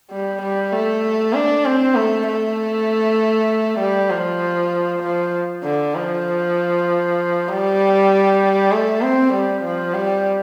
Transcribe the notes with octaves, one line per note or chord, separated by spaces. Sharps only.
G3
G3
A3
D4
C4
A3
A3
G3
F3
F3
D3
F3
G3
A3
C4
G3
F3
G3